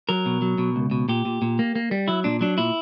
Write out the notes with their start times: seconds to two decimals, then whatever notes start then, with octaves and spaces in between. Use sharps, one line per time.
0.09 F#3 A#4
0.26 B2
0.42 F#3
0.58 B2
0.76 C#2
0.91 B2
1.09 A#2 G4
1.25 A#2
1.42 A#2
1.59 A#3
1.76 A#3
1.91 G3
2.08 F#3 E4
2.24 A#2 D4
2.41 F#3 D4
2.58 A#2 E4